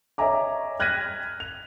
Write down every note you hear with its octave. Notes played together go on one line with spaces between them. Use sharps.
C#5 D#5 E5 G#5 A#5 D6
F6 F#6 G#6 A#6 B6 D#7
F7